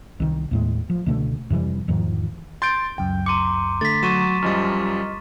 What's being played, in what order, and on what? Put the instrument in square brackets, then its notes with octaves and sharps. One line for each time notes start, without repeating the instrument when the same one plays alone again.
[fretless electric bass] C2 D#3
D#2 A2 G#3
F3
C#2 B2 D3 A3
F2 C3 E3 G3
E2 G#2 D#3 F3
[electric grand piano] C6 G6 D7 [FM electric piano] A6
[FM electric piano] C#2 F#2 [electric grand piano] G5
[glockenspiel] A#5 C6 D6 [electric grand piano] C#7 D#7
[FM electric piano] D3 A3 [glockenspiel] A6 B6
[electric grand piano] F#3 [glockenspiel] C#6 D#7 E7
[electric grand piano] F#2 F3 G3 [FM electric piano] D#5 F6